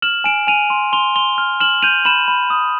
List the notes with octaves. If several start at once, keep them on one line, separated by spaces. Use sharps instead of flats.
F6 E7 F#7
G#5 D7 E7
G#5 D#7 F7
C6
C6 F7 G7
C6 F7 G7
F6
F6 E7 F#7
G6 D#7 F7
B5 E7 F#7
B5
D#6